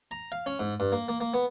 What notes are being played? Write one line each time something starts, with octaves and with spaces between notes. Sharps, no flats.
A#5
F5
C#4
G#2
G2
A#3
A#3
A#3
B3